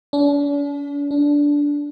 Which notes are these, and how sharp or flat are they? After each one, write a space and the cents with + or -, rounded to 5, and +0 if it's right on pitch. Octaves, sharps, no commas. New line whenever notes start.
D4 -45
D4 -15